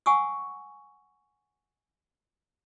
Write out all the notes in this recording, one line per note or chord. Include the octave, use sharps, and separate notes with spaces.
F#5 G#5 C#6 D#6 E6